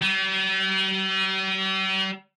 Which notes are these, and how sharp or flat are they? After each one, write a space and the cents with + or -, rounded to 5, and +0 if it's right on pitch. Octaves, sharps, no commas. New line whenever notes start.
G3 -45